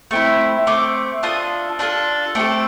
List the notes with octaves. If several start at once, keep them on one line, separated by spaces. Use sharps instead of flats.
A3 C4 E4
A3 C4 D6
D4 F4 A4 D#6
D4 F4 A4
A3 C4 A4 D6